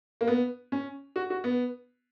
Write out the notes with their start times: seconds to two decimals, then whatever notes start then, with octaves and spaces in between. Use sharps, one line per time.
0.21 A#3
0.28 B3
0.72 C#4
1.16 F#4
1.30 F#4
1.44 B3